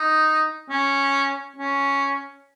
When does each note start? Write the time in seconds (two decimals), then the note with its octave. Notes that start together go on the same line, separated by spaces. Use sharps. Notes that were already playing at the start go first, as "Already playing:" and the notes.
Already playing: D#4
0.69 C#4
1.56 C#4